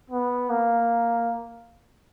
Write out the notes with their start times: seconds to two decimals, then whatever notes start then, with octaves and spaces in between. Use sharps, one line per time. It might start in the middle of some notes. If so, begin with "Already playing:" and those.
0.10 B3
0.50 A#3